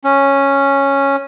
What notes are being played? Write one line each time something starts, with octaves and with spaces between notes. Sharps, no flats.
C#4